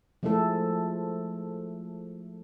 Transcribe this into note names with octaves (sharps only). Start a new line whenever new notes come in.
F3 G#3 A3 E4 A4